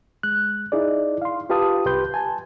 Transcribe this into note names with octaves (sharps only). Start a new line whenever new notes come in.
G#3 F#6
D#4 E4 G#4 D5
F5 C6
F4 G4 B4 F5 A5 D#6
C2 G4 B4 C6 G6
G#5 A5